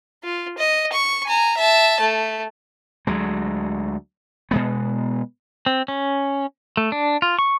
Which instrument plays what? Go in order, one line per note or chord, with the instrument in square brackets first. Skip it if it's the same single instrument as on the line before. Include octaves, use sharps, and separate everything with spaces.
[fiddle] F4
D#5
C#6
G#5 A#5
E5 A5
A3
[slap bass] D2 F#3 G#3
B2 G#3 B3
[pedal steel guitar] C4
C#4
A3
D4
F4
C#6